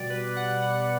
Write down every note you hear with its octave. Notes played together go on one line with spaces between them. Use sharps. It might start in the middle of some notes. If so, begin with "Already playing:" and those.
Already playing: B2 G3 D5
B4
F#5
F#5